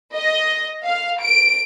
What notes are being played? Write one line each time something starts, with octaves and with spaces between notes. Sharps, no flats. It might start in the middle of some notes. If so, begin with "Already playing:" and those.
D#5
F5
D7